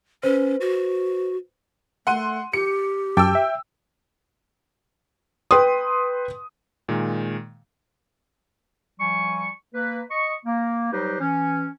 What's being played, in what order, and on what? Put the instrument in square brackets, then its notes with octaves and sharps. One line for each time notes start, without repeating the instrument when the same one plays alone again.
[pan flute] C#4 [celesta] B4 C5
[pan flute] F#4
[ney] A3 [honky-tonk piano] F#5 C6 D#7
[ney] G4 [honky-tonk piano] C#7
[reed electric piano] F#2 A5 D6 [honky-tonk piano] G5 E6
[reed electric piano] E5
[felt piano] B4 G5 C6 D#6
[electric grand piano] A#2 D#3 G#3
[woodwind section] F3 G3 G#5 C#6
A#3 B4
D#5 C#6
A#3
F#3 G3 D#4 G4 B4 C5
E3 C#4